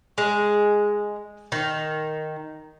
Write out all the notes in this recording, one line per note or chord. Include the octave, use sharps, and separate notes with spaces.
G#3
D#3